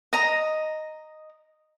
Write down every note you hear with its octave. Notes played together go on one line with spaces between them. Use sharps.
D#5 A#5